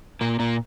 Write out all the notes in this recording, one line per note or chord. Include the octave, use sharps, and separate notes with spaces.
A#2 A#3
A#2 A#3